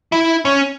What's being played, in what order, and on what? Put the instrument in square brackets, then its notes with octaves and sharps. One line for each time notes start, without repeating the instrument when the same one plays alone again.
[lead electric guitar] E4
C#4